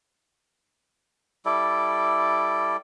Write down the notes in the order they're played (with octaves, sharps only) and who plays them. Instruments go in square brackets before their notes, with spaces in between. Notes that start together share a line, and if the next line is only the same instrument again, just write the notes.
[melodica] G3 E4 A4 D5